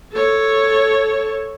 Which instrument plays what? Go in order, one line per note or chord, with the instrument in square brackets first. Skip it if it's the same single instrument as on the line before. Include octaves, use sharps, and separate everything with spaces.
[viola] A4 C#5